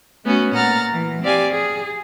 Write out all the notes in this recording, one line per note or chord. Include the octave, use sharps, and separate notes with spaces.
A3 B3 C#4 F#4
A#2 F#5 A#5 F6 A6
E3
C4 G4 D5 F5 G#5
G#4